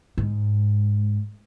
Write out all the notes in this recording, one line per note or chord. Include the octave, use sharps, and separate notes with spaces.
G#2